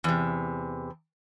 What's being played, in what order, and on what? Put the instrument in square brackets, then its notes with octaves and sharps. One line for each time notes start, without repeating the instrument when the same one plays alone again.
[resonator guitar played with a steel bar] E2 C3